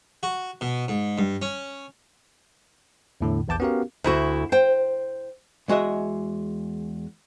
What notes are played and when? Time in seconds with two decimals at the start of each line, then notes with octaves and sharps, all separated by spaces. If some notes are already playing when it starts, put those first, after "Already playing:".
0.23 F#4
0.61 B2
0.88 G#2
1.18 G2
1.42 C#4
3.21 E2 A2 D3
3.48 A#1 E2 B3 A5 D6 G6
3.60 B3 C#4 F#4 G4 A#4 F5
4.04 D2 E4 F#4
4.52 C5 G5
5.68 E2 G#3 F#4 D#5 E5